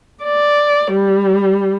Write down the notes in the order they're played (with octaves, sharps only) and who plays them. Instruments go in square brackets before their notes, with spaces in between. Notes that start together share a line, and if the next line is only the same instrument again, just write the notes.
[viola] D5
G3